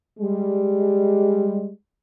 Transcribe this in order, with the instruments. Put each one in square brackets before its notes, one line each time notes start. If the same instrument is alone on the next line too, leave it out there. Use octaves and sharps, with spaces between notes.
[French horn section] G3 G#3